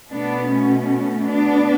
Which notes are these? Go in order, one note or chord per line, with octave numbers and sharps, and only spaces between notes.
B2 A3 B3 D4
C#4
B3 D4